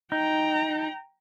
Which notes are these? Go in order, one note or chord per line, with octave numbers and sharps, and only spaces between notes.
D#4 G5 A#5